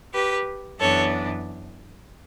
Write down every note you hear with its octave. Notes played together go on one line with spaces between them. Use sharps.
G4 B4
F#2 E3 B3 D4 A4 C#5